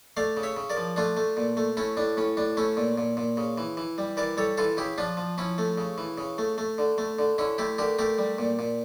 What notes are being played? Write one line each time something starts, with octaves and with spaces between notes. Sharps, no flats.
A3 D5 F5
C#3
C#5 E5
C#3
A#4 D5
F3
A3 D4 F4
A3
A#2
A3
A3 C#4 E4
A2 D4
A2 C#4
A2 D4
A3 C#4 E4
A#2
A#2
A#2
C#3
E3
E3
G3
E3 A#4 D5
G3 A4 C#5
E3 F4 A4
C#3 E4 G4
F3 D4 F4
F3
F3 C#4 E4
A3
C#3
E3
C#3
A3
A3
D3
A3
D3
D3 C#4 E4
A3 E4 G4
D3 G4 A#4
A3 G4 A#4
G3
A#2
A#2